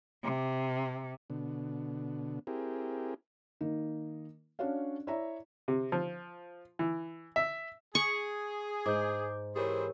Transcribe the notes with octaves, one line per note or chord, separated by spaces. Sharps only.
C3
B2 D3
C4 E4 G4 G#4 A#4
D#3 A#3 D#4
C#4 D4 F#4 C#5 D5 F5
E4 C#5 D5 E5 A#5
C3
F3
E3
E5
G#4 C#6
G#2 D6 G6
E3 G4 G#4 A#4 C5 C#5